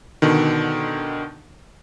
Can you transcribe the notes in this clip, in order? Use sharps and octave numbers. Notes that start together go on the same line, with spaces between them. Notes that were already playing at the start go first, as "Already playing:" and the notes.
B2 D3 D#3